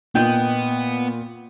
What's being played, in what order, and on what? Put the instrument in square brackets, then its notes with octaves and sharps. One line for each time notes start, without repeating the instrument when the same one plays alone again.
[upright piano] A#2 [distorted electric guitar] B3 [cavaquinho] D#5 G5